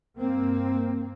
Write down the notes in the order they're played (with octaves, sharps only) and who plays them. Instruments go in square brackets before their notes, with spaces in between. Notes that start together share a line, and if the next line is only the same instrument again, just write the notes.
[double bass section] G2 A#3 C4